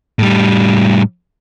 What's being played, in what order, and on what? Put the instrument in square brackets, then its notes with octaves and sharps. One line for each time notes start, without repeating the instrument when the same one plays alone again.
[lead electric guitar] A2 G3